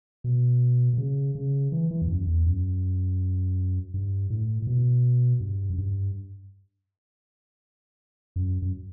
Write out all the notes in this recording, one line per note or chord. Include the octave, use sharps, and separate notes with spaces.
B2
B2
C#3
C#3
E3
E3
E2
F#2
E2
F#2
G2
A2
A2
B2
G2
F#2
G2
F#2
F#2